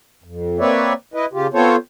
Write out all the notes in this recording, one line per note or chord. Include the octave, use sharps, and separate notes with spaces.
F2
A#3 C4 B4 C#5 D5 E5
E4 B4 D#5
C#3 F4 G4
B3 C4 F4 A4 C5 C#5